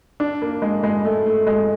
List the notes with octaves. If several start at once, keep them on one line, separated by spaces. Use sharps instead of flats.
D4
A#3
G#3
G#3
A3
A3
G#3